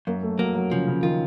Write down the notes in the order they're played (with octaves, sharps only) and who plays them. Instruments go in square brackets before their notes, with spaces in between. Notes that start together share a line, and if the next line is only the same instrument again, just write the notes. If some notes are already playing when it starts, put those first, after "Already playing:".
[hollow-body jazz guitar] F#2 [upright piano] A#3
[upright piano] A3
[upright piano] F#3 [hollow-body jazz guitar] A#3
[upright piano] F#3
[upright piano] C#3 [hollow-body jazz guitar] F3
[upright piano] C#3
[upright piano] D#3 [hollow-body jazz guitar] F4